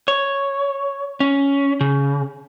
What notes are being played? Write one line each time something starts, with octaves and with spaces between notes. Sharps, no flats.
C#5
C#4
C#3